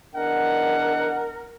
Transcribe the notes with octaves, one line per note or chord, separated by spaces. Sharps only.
E2 D4 A#4 D#5 F#5